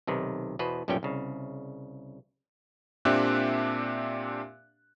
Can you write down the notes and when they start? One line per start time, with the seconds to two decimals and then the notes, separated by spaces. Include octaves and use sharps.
0.07 B1 C3 D#3 B4
0.59 E2 B2 B4 C5
0.88 B1 F#2 A#2 G3 C#4 G5
1.03 C2 C#3
3.05 A#2 C4 D4 G4 E5 F#6